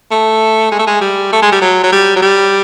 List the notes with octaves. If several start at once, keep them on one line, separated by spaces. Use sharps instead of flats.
A3
G#3
A3
G#3
G3
A3
G#3
G3
F#3
F#3
G3
F#3
G3